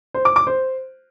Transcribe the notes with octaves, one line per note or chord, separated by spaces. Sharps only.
C5
D6
D6
C5